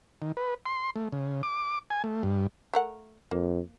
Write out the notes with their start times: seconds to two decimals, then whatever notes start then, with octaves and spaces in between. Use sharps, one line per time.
0.22 D#3
0.37 B4
0.66 C6
0.96 A3
1.12 C#3
1.43 D6
1.90 G#5
2.04 A3
2.23 G2
2.74 A3 A#4 F#5
3.31 F2 A#3